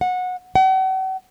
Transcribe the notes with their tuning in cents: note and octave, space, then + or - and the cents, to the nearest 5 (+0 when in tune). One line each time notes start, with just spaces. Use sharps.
F#5 -20
F#5 +45